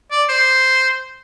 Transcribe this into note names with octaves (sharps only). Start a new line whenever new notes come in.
D5
C5